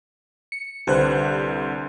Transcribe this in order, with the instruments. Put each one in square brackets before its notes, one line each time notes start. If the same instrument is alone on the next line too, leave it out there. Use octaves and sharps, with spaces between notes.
[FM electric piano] C#7
[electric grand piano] C2 D3 F#6 [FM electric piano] G4 B4 C5